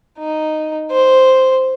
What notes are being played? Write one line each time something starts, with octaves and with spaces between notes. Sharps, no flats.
D#4
C5